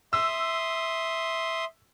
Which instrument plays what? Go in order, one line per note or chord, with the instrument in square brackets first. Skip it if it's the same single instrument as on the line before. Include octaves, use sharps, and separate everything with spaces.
[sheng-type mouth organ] E5 C6 D#6 [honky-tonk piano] E6